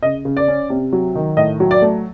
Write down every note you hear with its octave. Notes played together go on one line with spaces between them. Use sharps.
C#3 D#5
C#3
D5
C#4
C3
F#3
D#3
A2 D#5
F#3
D5
A3